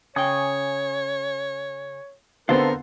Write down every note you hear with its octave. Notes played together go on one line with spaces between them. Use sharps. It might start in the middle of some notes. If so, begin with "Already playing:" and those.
C#3 C#5 G5 G#5 C#6 D#6
D3 B3 C4 A#4 C5 F5 A5 E6